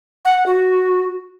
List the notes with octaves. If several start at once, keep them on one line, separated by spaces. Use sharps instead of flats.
F#5
F#4